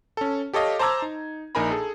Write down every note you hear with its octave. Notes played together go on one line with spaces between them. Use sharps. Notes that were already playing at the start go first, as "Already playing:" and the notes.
C#4 A4
G4 A4 C#5 D#5 F5
C5 A5 A#5 D6 E6 G#6
D#4
A#1 D#4 A#4 G#5 A#5 B5
G#4 A4